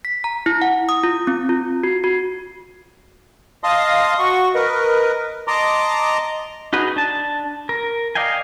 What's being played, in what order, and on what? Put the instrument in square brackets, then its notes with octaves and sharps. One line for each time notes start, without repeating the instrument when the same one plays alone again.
[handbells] B6
A#5
E4
F#5
D#6
F4
C4
F4
F#4
F#4
[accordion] D#5 F5 A5 C6 D#6
F#4 C#6
A#4 B4 D#5
D#5 A5 A#5 C6 D6
[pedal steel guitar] D#4 F#4 G#4 B4
D4 A5
A#4
D5 D#5 F5 G5 G#5